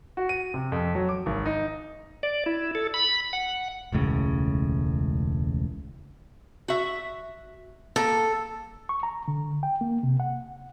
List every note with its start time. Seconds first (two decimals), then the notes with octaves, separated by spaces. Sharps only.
0.17 F#4
0.29 D#7
0.54 C3
0.72 F2
0.95 F#3
1.09 D6
1.26 G#1
1.46 D#4
2.23 D5
2.46 E4
2.75 A4
2.94 B5
3.33 F#5
3.92 E1 C#2 A2 C#3
6.68 F#4 E5
7.96 A#3 A4
8.89 C#6
9.03 A#5
9.28 D3
9.63 G5
9.81 A#3
10.03 C3
10.20 F#5